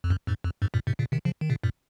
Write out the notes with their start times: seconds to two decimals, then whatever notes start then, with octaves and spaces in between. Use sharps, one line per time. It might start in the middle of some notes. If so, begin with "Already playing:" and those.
0.04 F2
0.10 F#2
0.27 F2 G#2
0.44 F2
0.62 F2 G#2
0.74 F#2 A#2
0.87 G#2 C3
0.99 A#2 C#3
1.12 C3 D#3
1.25 C#3 F3
1.41 D#3
1.50 A#2 C#3
1.63 F#2 A#2